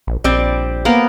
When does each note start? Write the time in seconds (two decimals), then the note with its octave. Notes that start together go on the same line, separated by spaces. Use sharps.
0.07 A#1
0.24 A#1 G3 C4 D5
0.85 A#3 B3 A#4